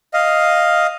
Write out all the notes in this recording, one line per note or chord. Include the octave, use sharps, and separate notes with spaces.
D#5 F5